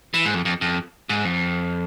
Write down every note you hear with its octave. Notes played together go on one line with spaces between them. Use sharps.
E3
G#2
F2
F2
F2
G#2
F2